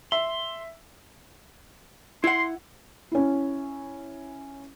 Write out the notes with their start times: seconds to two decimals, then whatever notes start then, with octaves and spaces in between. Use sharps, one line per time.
0.12 E5 C6
2.24 E4 F#5 C6
3.12 C#4 E4